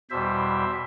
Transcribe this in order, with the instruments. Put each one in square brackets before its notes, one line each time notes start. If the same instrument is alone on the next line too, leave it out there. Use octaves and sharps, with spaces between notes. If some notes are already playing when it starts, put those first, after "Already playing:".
[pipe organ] E2 B2 G3 C5 E5